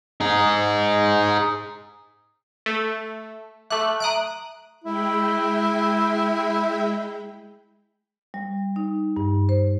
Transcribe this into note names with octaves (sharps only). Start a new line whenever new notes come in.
D#4 G#4
A3
A3 E5 D6 F#6
E5 A#5 D#6 F#6 D7
G#3 E4 G5 B5
G3
D#4
G2
C5